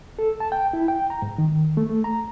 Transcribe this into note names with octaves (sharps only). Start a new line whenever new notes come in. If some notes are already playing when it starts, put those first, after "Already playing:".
A4
A5
G5
E4
G5
A#5
G#2
D#3
A3
A3
A#5